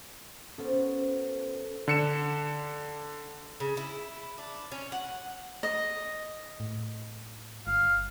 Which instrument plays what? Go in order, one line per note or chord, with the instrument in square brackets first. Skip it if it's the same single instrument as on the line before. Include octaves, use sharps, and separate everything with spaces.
[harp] B3 C#4 F#4 A4 C5 F#5
[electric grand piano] D3 C#7 E7
[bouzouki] C#3
E4
D4
C#4
F#5
[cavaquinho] D#5
[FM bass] A2
[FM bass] G1 [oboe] F5